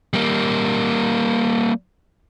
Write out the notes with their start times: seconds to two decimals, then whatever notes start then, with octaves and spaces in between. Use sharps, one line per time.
0.13 G3 A#3